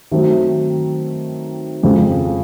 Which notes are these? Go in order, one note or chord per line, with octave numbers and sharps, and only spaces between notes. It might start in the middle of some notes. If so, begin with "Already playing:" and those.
D#3 F#3 A3 C4
F2 C#3 F3 G#3